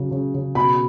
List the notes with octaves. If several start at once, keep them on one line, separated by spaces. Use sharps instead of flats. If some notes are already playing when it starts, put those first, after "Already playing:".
Already playing: C#3 F#3
C#3
C#3
B2 B5